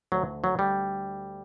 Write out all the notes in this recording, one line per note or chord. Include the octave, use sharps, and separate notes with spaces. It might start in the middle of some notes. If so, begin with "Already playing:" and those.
D2 D3 F#3
F#3
G3